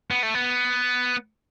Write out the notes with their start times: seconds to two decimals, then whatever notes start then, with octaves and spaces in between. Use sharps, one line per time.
0.11 B3
0.23 A3
0.34 B3